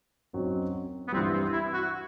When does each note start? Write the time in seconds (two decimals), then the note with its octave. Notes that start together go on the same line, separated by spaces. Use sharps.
0.33 F#2 F#3 C4 D#4
1.08 B3
1.12 G2 E3 G3 C4
1.33 C4
1.53 E4
1.74 F#4